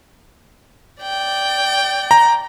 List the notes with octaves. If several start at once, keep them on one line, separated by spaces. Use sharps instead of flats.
D5 G5
A#5